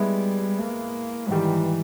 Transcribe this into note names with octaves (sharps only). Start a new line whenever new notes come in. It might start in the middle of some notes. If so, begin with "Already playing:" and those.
Already playing: G3 G#3 B3 E4
A#3
G#2 D#3 E3 G3